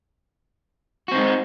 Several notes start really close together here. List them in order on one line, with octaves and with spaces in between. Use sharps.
F#4 C4 D#4 G#3